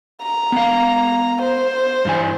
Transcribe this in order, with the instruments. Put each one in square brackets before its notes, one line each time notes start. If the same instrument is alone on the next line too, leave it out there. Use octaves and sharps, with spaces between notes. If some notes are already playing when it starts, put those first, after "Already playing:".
[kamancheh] A#5
[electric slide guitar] B3 F5
[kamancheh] C5
[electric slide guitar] G2 E3 G#5